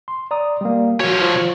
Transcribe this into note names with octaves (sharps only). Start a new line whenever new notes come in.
C6
D5 A#5 D#6
G3 A#3
F3 F#4 C#5
F4 C5